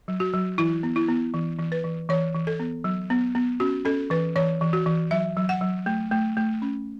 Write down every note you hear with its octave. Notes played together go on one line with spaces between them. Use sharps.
F#3
F#4
F#3
E3 E4
B3
E4
B3
E3
E3
B4
E3
E3 C#5
E3
A4
B3
F#3
B3
B3
C#4 F#4
C#4 A4
E3 B4
E3 C#5
E3
F#4
E3
F#3 E5
F#3
F#5
F#3
A3
A3
A3
C#4